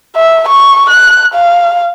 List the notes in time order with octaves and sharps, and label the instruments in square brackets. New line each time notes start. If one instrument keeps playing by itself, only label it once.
[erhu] E5
C#6
F#6
F5